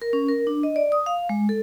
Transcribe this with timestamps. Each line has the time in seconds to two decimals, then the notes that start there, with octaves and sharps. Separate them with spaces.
0.02 A#4
0.13 C#4
0.29 A#4
0.47 D4
0.63 D#5
0.76 D5
0.92 D#6
1.06 F5
1.29 G#3
1.49 A4